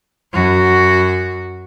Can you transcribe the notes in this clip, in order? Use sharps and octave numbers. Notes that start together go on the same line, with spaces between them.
F#2 F#4